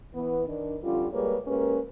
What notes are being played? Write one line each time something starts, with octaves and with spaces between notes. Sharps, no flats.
E3 B3 B4
D#3 D4
F2 D3 G3 C#4 F4
G3 G#3 A#3 G#4 B4 C#5
G#3 A#3 C#4 G4 A#4 B4